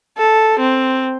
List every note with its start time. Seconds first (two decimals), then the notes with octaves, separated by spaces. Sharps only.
0.18 A4
0.60 C4